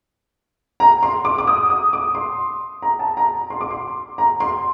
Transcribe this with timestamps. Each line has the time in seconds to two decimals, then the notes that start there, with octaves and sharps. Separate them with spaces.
0.80 A#5
1.03 C6
1.25 D6
1.38 D6
1.47 D#6
1.70 D#6
1.93 D6
2.15 C6
2.82 A#5
2.99 A5
3.17 A#5
3.50 C6
3.61 D6
3.71 C6
4.18 A#5
4.40 C6